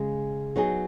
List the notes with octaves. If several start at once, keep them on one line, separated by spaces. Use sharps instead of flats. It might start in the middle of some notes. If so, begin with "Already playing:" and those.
Already playing: C#3 G#3
F#3 B3 D#4 G#4